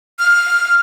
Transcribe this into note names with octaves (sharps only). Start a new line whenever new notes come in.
F6